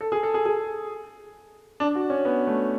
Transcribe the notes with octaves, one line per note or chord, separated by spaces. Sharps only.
A4
G#4
A4
G#4
G#4
D4
F#4
C#4
B3
A3